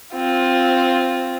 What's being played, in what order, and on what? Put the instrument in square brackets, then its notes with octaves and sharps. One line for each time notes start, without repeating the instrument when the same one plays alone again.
[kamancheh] C4 F4